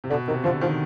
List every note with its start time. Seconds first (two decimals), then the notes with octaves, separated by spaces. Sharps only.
0.04 C3
0.10 B2 D3
0.28 C3 D#3
0.44 D3 F3
0.61 D#3 F3